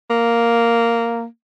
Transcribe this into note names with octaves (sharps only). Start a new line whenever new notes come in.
A#3